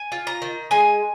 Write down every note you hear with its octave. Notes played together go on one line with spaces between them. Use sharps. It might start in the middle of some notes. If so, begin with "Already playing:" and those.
Already playing: G#5
F4
A#5
D#3
G#3 G#5